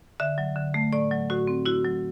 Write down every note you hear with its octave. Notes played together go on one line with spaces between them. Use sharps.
D3 E5
F#3
D3
A3
A2 D5
F#3
A2 F#4
C4
E4 F#4
F#3